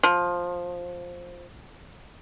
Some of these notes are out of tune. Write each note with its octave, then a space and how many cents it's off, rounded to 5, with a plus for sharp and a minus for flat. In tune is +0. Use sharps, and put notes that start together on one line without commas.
F3 +10